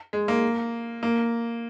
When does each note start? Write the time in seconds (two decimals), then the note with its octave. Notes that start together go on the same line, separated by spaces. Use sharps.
0.13 G#3
0.28 A#3
1.03 A#3